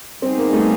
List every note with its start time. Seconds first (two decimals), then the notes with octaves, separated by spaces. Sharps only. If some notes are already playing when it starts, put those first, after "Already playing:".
0.22 G3 B3 C4 D#4 G#4
0.38 A#3
0.53 A3